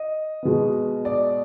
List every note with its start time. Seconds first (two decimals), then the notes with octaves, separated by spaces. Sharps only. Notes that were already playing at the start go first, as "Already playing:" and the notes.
Already playing: D#5
0.43 B2 G#3 B3
1.05 D5